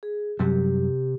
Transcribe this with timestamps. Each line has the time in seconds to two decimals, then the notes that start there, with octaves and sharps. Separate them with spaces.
0.03 G#4
0.39 F#2 C3 F#3 G3 G4